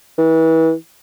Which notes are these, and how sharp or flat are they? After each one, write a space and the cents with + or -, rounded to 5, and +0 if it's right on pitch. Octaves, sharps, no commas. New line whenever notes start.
E3 -30